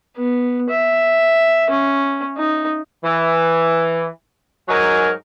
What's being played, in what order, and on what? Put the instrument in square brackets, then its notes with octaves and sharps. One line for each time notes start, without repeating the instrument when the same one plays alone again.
[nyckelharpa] B3
E5
C#4
D#4
[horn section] E3
G#2 F#3 D#4 A#4 G#5